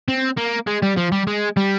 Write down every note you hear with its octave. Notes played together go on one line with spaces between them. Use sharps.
C4
A#3
G#3
G3
F3
G3
G#3
G3